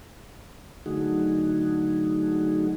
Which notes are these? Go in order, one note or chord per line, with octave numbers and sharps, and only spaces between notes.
D3 F#3 A3 D#4 F#4 G#4